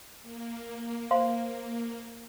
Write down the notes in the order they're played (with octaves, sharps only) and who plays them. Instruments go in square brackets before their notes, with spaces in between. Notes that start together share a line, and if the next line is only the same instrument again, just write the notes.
[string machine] A#3
[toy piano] C5 F5 C6